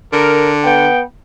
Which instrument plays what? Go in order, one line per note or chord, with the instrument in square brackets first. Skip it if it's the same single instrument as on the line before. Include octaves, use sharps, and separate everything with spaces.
[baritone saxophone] D3 [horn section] A#4
[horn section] B3 G5